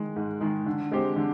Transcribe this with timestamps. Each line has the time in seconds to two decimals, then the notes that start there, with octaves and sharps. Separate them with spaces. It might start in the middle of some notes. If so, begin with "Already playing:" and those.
Already playing: D#3 G#3
0.16 G#2
0.41 D#3 G#3
0.66 D3
0.91 G#3 C4 G4 C5
1.16 D3